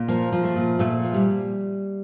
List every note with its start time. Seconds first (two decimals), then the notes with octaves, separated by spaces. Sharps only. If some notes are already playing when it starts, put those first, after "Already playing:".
Already playing: A#2
0.08 F3 A#3
0.32 F3
0.44 A3
0.56 A#2
0.79 A#2 A3
1.03 F3
1.14 G3